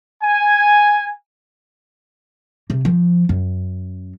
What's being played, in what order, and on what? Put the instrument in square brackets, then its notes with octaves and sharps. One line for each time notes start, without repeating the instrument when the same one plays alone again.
[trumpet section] G#5
[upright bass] C3
F3
F#2